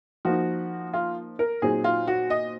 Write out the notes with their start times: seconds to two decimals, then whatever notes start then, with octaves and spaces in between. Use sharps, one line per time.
0.25 F3 A#3 D#4 F#4
0.93 F4
1.39 A#4
1.62 A#2 F#3 C4 D#4 G#4
1.84 F4
2.07 F#4
2.30 D#5